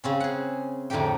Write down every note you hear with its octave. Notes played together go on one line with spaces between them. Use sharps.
C#3 C4 C#4
G#4 F#5
F2 A2 D3 D#4 G4 G5